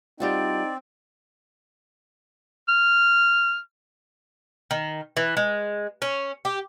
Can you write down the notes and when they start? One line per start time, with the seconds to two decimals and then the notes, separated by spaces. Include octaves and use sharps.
0.20 G3 C4 D#4 F4 F#4 D5
2.68 F6
4.71 D#3
5.17 E3
5.37 G#3
6.02 C#4
6.45 G4